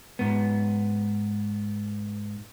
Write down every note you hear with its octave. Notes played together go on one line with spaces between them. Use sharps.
G#2 B3